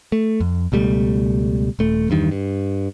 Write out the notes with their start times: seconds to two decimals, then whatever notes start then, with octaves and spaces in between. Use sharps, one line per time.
0.12 A3
0.41 F2
0.72 C#2 B2 G3 A3
1.79 D#1 A3
2.10 E2 G2 D#3
2.31 G2